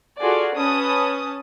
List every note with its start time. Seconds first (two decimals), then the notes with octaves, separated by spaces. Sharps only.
0.20 F4 F#4 G#4 A4 D5
0.54 C#4 B4 A5 D#6